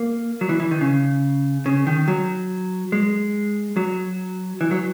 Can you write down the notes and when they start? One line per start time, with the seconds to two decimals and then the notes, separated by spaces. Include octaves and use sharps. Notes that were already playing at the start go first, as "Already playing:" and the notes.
Already playing: A#3
0.41 F#3
0.49 E3
0.60 E3
0.71 D#3
0.81 C#3
1.66 C#3
1.87 D#3
2.08 F#3
2.92 G#3
3.77 F#3
4.61 E3
4.71 F#3